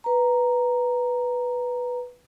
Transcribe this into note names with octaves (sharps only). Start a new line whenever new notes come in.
B4 A#5